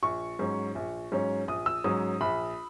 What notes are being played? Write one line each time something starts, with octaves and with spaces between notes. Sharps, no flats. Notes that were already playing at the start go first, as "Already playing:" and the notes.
A#1 C#6
G#2 F#3 C#4
A#1
G#2 F#3 C#4
A#1 D#6
E6
G#2 F#3 C#4 D#6
A#1 B5